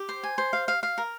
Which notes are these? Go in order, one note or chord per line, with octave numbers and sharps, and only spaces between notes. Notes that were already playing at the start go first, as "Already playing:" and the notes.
Already playing: G4
C5
G#5
C5
F5
F5
F5
A#4